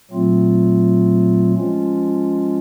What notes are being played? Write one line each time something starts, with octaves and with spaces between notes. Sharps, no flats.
A#2 F#3 A3 C4 F4
F3 G#3 C#4 F4